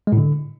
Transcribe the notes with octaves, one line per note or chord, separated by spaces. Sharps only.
G#3
A2
D3